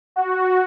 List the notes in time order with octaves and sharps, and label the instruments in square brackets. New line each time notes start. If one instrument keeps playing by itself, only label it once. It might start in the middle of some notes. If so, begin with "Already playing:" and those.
[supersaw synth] F#4